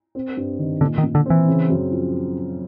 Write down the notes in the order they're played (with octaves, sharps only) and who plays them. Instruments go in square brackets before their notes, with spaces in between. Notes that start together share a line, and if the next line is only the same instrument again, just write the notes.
[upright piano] C4
G2
D#3
[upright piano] A#2 [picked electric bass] D3
[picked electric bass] D#3
[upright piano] A#2
[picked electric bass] D3
[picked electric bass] E3 [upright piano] C4
[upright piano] C#3
F#2
F3